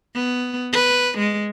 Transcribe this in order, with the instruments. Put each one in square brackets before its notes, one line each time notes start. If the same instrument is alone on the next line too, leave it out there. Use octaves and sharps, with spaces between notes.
[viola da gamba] B3
B4
G#3